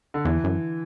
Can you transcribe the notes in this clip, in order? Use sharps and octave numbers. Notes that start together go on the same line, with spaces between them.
D3
E2 E3
F#2